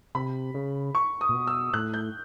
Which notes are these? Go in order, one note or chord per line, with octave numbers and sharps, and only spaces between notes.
C3 B5
C#3
C#6
D#6
A#2
B2
E6
A2 F#6
G6